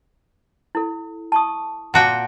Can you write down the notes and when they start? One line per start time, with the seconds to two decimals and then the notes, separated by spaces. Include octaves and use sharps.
0.75 E4 A4
1.32 A5 C#6 D#6
1.94 A#2 F#4 F#5 G5 A5 D6